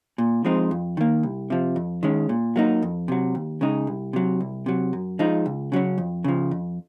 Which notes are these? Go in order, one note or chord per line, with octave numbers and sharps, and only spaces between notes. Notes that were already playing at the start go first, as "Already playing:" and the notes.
A#2
F3 G#3 C4 D#4
F2
D#3 A#3
C2
C3 F3
F2
D#3 G#3 C#4
A#2
F#3 A#3 D#4
F2
C3 F#3
D#2
C#3 G#3 D#4
C2
C3 F#3
C2
C3 F#3
F#2
F3 G#3 D#4
C#2
C#3 F#3 C#4
F2
C#3 F3
F2